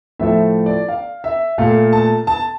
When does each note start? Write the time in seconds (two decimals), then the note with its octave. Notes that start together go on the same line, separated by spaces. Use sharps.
0.19 A2 F3 A3 E5
0.66 D5
0.88 F5
1.24 E5
1.58 A#2 A3 F5
1.93 A5
2.27 A5